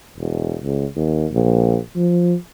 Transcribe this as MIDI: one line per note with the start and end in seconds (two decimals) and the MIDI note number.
0.18 0.56 28
0.63 0.85 37
0.96 1.26 39
1.32 1.77 34
1.96 2.34 53